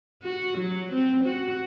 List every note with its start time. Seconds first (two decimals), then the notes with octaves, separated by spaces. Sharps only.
0.23 F#4
0.59 F#3
0.93 C4
1.25 F#4